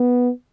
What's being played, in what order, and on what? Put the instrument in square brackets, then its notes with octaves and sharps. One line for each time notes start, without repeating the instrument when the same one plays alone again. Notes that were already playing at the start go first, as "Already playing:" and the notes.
Already playing: [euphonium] B3